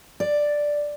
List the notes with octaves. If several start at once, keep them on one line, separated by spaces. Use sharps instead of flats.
D5